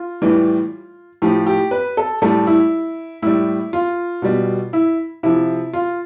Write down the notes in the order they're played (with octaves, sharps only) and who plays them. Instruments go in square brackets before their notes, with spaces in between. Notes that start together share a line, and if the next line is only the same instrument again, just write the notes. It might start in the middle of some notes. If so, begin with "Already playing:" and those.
Already playing: [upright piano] F4
A2 E3 G3
A2 F3 G4
G4
B4
A4
A2 G3 A4
E4
A2 G3 E4
F4
B2 G3
E4
C3 F3 E4
F4